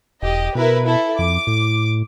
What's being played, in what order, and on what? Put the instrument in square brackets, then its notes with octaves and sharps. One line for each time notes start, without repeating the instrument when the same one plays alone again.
[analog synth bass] E1 [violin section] G4 D#5
[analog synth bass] B2 [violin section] E4 A#4 B4
[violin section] E4 A4
[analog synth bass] F2 [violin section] D6
[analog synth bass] A2